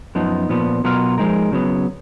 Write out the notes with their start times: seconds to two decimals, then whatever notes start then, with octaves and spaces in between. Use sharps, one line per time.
0.15 F#2 F3 B3 D#4
0.49 A#2 F3 B3
0.84 B2 F#3 B3 F4 A#4
1.18 F3 G#3 D#4 A#4
1.52 C#3 F#3 B3